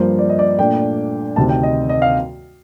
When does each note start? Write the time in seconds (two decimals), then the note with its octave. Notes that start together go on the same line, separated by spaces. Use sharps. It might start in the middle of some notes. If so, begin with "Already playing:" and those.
Already playing: G2 F3 A#3 C5
0.19 D5
0.29 D#5
0.39 D5
0.59 A#2 A3 D4 G5
1.36 D2 C3 D#3 A5
1.49 G5
1.63 D#5
1.89 D#5
2.02 F5